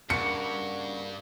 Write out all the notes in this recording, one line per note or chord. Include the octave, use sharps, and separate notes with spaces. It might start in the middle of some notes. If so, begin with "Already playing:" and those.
G2 C#3 A#3 F#4 C#7